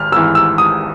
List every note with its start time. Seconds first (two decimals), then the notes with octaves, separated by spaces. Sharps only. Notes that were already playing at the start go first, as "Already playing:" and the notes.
Already playing: G#1 F6
0.12 G#1 G#2 E3 E6
0.35 E6
0.58 D#6